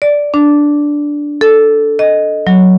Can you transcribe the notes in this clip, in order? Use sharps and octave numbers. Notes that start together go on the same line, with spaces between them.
D5
D4
A4
D#5
F#3